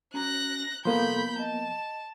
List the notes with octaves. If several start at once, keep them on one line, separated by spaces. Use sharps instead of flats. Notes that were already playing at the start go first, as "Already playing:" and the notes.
C#4 F#4 A#5 F#6 A#6
C2 F3 A#3 B3 A4 B5 C6 G6
D#5 A5